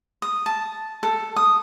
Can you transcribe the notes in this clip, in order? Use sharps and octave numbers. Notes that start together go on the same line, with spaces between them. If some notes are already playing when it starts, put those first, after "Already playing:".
D#6
A5
A4
D#6